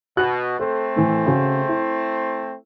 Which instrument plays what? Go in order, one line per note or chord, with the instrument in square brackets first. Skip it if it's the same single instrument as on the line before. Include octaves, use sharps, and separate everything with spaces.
[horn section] B2 [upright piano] F#4 F#6
[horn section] A3 C4 C5 [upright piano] A4
[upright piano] A2 E3
C#3 F#4
E4